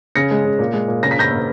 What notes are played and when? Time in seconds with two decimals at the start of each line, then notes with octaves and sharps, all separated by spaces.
0.16 C#3 A#6 C#7
0.31 G#3
0.45 C#3
0.59 A#2
0.73 G#3
0.88 A#2
1.03 C#3 A#6
1.11 B6
1.17 C#3 G6 A#6
1.31 A#3